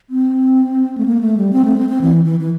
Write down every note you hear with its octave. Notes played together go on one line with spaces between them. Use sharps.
C4
A3
A#3
A3
G3
C4
A3
C4
C4
E3
E3
E3